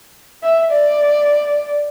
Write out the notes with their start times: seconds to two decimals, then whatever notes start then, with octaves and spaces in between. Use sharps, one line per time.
0.43 E5
0.71 D5